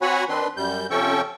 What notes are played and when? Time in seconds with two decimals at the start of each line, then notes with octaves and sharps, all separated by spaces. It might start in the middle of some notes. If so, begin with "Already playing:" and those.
0.02 C4 F#4 C#5 F#5 G#5 B5
0.29 D#3 C4 D4 B4 C6
0.57 F#2 G3 G6
0.91 C3 F3 C#4 A4 G5 C#6